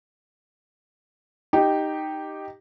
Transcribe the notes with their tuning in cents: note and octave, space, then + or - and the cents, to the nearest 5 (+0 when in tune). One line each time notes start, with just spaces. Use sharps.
D#4 -5 G4 +0